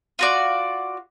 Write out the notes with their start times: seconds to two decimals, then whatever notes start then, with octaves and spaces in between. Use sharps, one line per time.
0.19 F4 F#4 D5